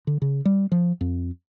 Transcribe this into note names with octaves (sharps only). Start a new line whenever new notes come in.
D3
C#3
G3
F3
F2